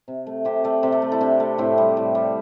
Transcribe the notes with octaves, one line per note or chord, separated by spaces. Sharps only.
C3
A3
C3 G4 C5
A3 A4 D5
C3 G4 C5
A4 D5
A3
E4 A4
C3 D4 G4
A3
A2 C4 E4
G3
A2
G3